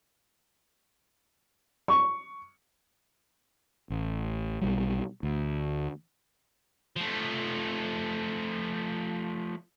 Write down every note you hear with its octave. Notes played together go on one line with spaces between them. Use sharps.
C#6
A1
B1 G3
D2
F3 A3